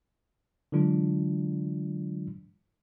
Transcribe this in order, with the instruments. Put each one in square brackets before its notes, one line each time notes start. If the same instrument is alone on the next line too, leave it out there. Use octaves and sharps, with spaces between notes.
[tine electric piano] D3 E3 F#3 G#3 D4 F4